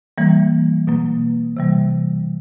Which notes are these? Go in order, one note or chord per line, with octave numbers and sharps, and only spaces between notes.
E3 G3 A#3
B2 F#3 A#3
C3 E3 G3